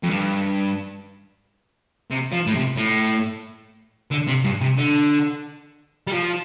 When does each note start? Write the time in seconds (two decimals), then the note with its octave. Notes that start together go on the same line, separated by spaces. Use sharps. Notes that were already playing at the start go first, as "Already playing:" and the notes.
0.03 F2
0.10 G2
2.10 C3
2.32 F3
2.47 A2
2.56 C3
2.77 A2
4.11 D3
4.27 C3
4.44 G2
4.61 C3
4.78 D3
6.07 G3
6.12 F3